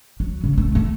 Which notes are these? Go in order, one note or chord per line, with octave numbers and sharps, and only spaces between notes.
F#3
C#3
A3
F2 A3